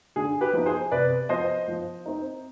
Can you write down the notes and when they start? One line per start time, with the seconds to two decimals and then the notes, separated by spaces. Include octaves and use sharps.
0.16 D3 G#4
0.41 G4 B4
0.53 F3 B3 D#4
0.66 G#4 C5
0.92 C3 B4 D5
1.29 F3 B3 C5 D#5
1.68 F3
2.06 C4 D#4